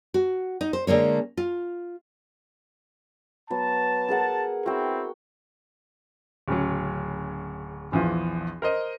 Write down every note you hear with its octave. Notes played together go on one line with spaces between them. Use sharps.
F#4
D#4
C5
D3 G#3 A#3 C#5
F4
F#3 B3 A5
G#4 A#4 F#5
C4 E4 F#4 G5
D1 C#3 F#3
A#1 E2 E3 F3
A#4 C5 D#5